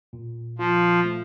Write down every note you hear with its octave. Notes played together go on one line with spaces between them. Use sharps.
A#2
F3 F4
A3